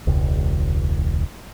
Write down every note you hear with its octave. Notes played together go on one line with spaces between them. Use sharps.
E1 C#2